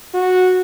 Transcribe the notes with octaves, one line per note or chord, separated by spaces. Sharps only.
F#4